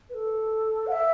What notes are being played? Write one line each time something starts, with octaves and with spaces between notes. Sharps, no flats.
B4
A4
F#5
E5